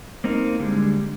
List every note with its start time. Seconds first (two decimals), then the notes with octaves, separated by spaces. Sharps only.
0.24 A#3 C4 D#4 A#4
0.59 D3 G3 G#3